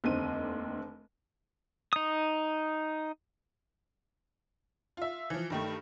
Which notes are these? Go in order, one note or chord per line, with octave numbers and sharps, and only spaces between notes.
F1 D#2 D3 C4 D#7
D#4 D#6
F4 E5
E3 F3
G2 D#3 A3